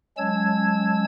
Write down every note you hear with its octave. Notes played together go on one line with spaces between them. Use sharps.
F#3 G#3 C#4 A5 E6 G#6